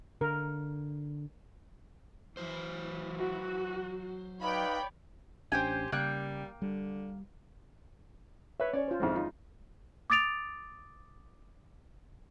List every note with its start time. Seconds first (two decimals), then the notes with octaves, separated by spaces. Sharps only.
0.21 D3 A#4
2.37 E3 F#3 C5
3.18 F#4
4.42 D#4 B4 C#5 D5 F5 G5 B5
5.52 A1 C#4 D4 G4 C5 G5 G#5
5.92 C#3 G3 A#3 G5 F#6
6.62 D3 G3
8.60 B4 C#5 E5
8.73 C#4 C#5 D5
8.88 F4 C5
9.00 F2 D#3 G#3 C4 E4
9.15 D#4 F4
10.10 D6 D#6 A6 D7 F7